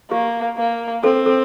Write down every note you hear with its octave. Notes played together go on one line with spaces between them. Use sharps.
A#3 G4
A#3
C4 A4
A4